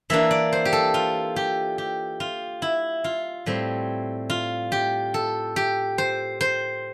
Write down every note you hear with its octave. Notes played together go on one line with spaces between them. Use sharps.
E3 A#3 D4 E5
D5
C5
G4
A4
F4
G4
G4
F4
E4
F4
A2 G3 C4
F4
G4
A4
G4
C5
C5